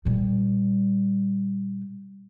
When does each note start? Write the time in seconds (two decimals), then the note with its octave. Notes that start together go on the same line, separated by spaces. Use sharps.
0.05 A#2 G3